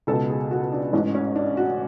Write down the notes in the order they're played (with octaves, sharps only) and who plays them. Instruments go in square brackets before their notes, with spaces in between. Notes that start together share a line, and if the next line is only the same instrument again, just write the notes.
[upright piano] C#2 B2 A4
G#4
F#4
D4
A1 G#2 E3 C#4
C#4
D4
F#4